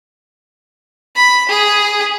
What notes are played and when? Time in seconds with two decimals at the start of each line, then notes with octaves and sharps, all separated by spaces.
1.16 B5
1.49 G#4